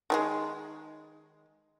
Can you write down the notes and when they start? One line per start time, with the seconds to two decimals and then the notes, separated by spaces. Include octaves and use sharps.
0.10 D#3 G3 G#3